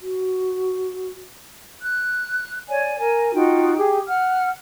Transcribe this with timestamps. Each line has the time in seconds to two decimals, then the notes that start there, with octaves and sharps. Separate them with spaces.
0.01 F#4
1.81 F#6
2.69 C#5 D5 G#5
2.99 A#4 G#5
3.33 D#4 F4 F#4 G5
3.77 G4 G#4
4.07 F#5 F6